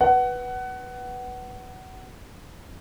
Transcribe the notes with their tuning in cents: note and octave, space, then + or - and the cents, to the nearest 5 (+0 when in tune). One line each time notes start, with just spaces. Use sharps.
B4 -5 F#5 +20